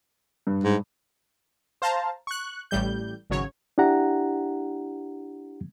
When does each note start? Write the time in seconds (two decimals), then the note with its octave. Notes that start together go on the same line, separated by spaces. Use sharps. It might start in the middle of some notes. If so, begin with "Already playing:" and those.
0.47 G2
0.64 G#2
1.82 C5 F5 A5 A#5
2.27 C#6 F#6
2.71 A1 A2 G3 G6
3.30 G#1 C#3 F#3 C#5
3.78 D4 E4 G4 F#5 A#5